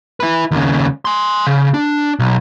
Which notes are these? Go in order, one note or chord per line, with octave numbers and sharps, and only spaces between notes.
E4 B4
D#2 C#3
G#5 C6
C#3
D4
B1